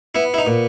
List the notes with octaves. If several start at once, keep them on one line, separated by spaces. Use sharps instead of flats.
B3 E4
E4
D#4
A#2